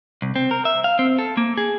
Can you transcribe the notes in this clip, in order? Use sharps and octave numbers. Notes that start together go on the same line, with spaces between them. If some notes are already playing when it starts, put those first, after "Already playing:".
C2
C4
A#4
E5
F5
C4
A4
A#3
G#4